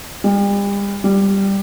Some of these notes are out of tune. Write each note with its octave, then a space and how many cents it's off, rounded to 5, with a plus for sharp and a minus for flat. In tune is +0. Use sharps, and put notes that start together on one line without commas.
G3 +40
G3 +5